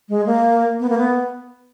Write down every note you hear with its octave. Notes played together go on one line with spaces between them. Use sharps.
G#3
A#3
B3
A#3
B3